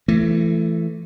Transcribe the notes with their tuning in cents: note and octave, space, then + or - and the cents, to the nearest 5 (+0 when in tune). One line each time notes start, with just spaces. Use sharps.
E3 +25 A3 +0